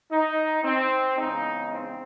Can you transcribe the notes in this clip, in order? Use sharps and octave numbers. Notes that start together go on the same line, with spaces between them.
D#4
C4
E2 C#3 G#3 D#4
C4